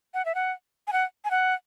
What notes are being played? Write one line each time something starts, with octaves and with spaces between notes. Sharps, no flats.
F#5
E5
F#5
G#5
F#5
G#5
F#5